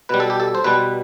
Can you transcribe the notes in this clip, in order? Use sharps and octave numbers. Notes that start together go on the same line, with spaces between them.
B2 G3 B4
A4
G4
A4
C5
B2 G3 B4